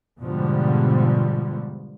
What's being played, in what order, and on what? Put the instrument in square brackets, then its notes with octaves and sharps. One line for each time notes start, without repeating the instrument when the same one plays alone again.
[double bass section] G#2 B2 D3 F3 G3